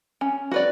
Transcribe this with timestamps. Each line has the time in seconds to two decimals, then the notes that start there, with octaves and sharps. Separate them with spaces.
0.21 C#4
0.51 F#4 B4 D5